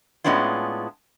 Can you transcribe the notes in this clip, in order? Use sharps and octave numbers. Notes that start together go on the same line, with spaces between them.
A2 G#3 B3 C#4 D4 F4